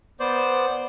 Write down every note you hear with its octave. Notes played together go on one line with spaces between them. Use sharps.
B3 C5 D5